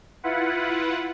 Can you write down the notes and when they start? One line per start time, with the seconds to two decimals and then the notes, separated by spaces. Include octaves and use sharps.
0.24 E4 F4 B4 F#5